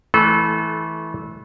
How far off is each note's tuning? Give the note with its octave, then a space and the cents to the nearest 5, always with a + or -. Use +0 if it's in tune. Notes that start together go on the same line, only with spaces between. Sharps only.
E3 -15 A3 -20 A4 -35